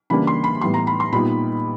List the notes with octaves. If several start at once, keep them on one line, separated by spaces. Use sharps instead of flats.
C#3 E3 G3 A#3 D4 B5
C6
B5
A2 E3 G3 B3 C6
A#5
B5
C6
A#2 G3 B3 D#4 B5